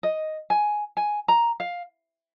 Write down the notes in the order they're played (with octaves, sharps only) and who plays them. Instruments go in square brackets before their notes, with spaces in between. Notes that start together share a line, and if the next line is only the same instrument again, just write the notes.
[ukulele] D#5
G#5
G#5
A#5
F5